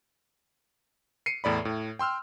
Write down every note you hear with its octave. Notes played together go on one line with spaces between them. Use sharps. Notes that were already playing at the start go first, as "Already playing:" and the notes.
C7 C#7 D#7
E2 A2 D5 B5
A2
G5 C6 E6 F6